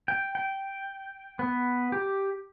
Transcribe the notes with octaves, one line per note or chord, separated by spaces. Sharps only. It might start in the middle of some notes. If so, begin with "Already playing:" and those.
G5
G5
B3
G4